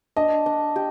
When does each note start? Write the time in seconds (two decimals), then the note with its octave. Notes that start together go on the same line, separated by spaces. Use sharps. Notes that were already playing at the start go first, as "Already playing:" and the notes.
0.16 D4 D#5
0.46 D4
0.76 G4